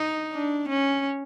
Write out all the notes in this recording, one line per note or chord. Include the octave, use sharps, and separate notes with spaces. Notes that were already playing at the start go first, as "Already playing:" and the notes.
Already playing: D#4
D4
C#4